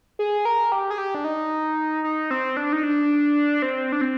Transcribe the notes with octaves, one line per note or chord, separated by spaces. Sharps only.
G#4
A#4
G4
G#4
G4
D4
D#4
D#4
C4
D4
D#4
D4
C4
D4
C4